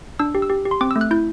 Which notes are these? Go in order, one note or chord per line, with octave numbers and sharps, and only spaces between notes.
D4 E6
G4
E6
G4
G4
C6
C4 D6
A3 E6
F#6
E4 G6